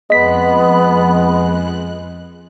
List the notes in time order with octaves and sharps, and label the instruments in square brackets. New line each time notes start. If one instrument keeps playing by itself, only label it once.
[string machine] F2 F#6 [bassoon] G#3 [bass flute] B3 [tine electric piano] D#5 B6